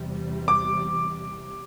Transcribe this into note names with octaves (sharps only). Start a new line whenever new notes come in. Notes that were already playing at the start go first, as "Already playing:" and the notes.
Already playing: E2 C3 G3
D6